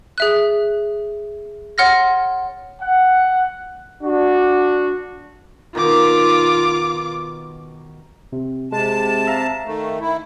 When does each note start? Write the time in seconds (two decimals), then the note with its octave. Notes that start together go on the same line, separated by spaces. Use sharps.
0.18 G#4 E5 F#6
1.78 C#5 F#5 C6 F6 A6 A#6
2.80 F#5
4.03 D4 F#4
5.75 B2 D#3 F4 D6
8.32 C3
8.72 C3 G#3 A5
9.27 E5 F5 A#5
9.66 D#3 A3
10.01 D#3 E4